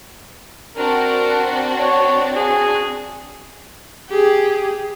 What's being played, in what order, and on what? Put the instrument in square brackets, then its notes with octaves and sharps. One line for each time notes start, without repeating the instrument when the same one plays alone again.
[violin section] C4 D4 F#4 [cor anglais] A#4
[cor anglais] C#5
G#4
[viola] G4 G#4